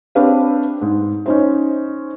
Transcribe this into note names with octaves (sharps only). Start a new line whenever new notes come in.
C4 D4 G4 B4 C#5 F5
G#2
C#4 D#4 C5